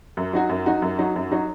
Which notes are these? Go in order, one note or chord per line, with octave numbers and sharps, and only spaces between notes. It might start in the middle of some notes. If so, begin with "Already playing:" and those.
F#2
F#3 D#4 F#4
F#2
F#3 D#4 F#4
F#2
F#3 D#4 F#4
F#2
F#3 D#4 F#4